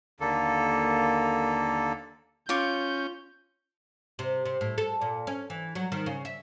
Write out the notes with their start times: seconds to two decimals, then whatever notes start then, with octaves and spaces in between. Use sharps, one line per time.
0.20 D#2 D3 A#3 A4
2.49 C#4 F4 C#5 D6 G6
4.19 C3
4.45 C3
4.61 A2
4.78 A4
5.01 A#2
5.27 C#4
5.50 E3
5.75 F#3
5.92 D#3
6.06 C#3
6.25 E5